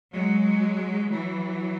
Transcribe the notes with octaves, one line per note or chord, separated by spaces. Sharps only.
F#3 G#3
E3 F#3